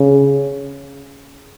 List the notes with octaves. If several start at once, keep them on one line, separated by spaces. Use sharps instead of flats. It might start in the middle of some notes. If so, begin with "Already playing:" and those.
Already playing: C#3